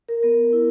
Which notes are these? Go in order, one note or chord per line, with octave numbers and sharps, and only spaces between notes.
A#4
B3 A#4
E4